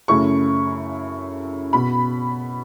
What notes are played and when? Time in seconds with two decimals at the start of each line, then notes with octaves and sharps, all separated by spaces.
0.08 F#2 C#3 A3 E4 C#6
1.73 B2 B5